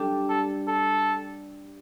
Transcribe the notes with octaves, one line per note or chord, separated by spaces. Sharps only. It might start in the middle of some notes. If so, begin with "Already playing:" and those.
Already playing: G3 D4 G4
A4
A4